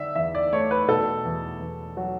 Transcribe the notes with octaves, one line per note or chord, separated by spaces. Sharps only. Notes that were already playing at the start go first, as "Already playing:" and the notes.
Already playing: D3 D4 E5
E2 E5
D5
A3 C#5
B4
B2 A4
E2
E2
F#3